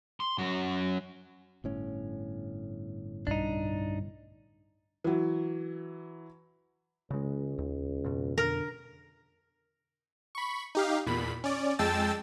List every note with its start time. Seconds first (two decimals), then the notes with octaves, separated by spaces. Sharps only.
0.20 C6
0.38 F#2 F#4
1.64 G1 A2 C#4
3.27 B1 G2 D4 D#4
5.04 E3 F#3
7.11 C#2 C#3 G#3
7.58 D#2
8.04 F2 B2
8.38 D3 A#4
10.35 B5 C#6
10.75 D#4 G4 F5
11.06 E2 A#2 B5
11.44 C#4 D5
11.79 F2 G#3 G5 A5 E6 A6